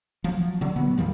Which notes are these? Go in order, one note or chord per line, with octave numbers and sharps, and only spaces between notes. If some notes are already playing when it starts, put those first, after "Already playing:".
F3 F#3
D3 F#3
A#2 F#3 B3
E2 D#3 F3 G3